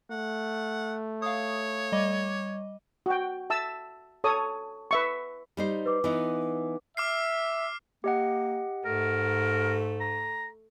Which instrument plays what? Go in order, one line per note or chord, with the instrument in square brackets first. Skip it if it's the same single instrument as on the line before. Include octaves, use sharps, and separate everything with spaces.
[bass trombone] A3 [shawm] F#5
[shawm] C#5 [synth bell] F5 D#6
[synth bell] G3 D#5 D6
[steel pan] F#4 G5
E5 A5 E6
A4 C#5 D#6
B4 E5 C#6
[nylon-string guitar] G3 D#4 C5
[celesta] B4 D6
[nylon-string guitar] E3 B3 D#4
[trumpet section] E5 [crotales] D6 F6 C7
[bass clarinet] A#3 [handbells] G4 D#5 F#5
[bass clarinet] G#2 [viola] A3 [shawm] A#4
[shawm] A#5